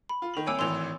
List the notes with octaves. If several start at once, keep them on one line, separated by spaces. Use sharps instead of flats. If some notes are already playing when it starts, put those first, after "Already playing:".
B5
F4
D#3 F7 F#7
C2 C#5 G#5 D6 E6 D7
G#1 A2 E3 C6 E6 F7